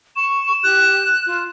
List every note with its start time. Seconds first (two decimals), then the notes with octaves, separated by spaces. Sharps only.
0.16 C#6 E7
0.63 G4 F#6
1.26 F4